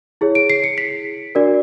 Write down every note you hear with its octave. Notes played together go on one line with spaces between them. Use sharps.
E4 G#4 C#5
D7
C7
C#7
B6
D4 F#4 A#4 D5